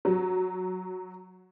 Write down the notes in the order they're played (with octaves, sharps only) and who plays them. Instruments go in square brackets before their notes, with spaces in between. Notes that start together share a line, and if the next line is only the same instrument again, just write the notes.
[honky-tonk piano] F#3